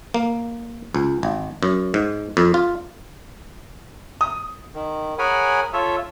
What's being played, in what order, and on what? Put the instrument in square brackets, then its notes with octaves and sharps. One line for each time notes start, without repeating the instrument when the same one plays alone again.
[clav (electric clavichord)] A#3
C#2
G#1
F#2
G#2
F2
F4
[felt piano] D#6
[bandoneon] D#3
G#4 A#4 C#5 F#5 G#5 B5
F4 A4 C#5 E5